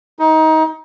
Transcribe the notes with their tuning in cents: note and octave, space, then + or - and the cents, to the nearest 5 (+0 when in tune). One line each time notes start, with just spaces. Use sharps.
D#4 +25